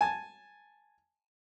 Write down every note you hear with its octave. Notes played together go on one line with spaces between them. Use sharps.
G#5 A5